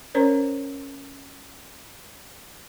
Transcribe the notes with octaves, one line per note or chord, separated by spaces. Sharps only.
C#4 A#4 C5 C#5